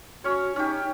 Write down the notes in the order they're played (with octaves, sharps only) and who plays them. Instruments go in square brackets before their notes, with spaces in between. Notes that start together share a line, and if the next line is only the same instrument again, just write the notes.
[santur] C#4 C#5 [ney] F#4
[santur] C#4 G4 [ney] D#4